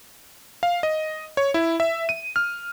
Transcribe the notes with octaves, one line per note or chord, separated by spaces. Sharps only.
F5
D#5
C#5
E4
E5
D#7
F6